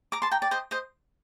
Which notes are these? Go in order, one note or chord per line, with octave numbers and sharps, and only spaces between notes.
A#5 D6
A5 C6
G5 A#5
D5
C5 D#5
C5 D#5